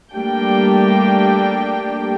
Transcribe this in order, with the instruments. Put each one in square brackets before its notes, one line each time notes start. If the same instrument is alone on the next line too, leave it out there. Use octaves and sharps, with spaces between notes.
[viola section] G3 A3 A#3 D4 G4 G5